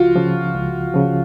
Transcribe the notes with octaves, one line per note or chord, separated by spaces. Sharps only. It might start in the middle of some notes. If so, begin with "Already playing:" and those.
Already playing: C#2 C#3 F3 F4 F#4
C#3 F3
C#2
C#3 F3